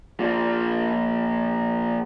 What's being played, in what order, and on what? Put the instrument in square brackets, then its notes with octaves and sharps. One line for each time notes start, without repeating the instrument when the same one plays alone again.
[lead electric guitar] A#2 F3